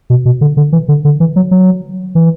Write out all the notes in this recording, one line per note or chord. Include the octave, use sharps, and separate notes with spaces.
B2
B2
D3
D3
E3
D3
D3
E3
F#3
F#3
E3